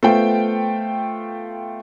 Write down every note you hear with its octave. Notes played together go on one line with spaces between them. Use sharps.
A3 B3 F4 C5 G5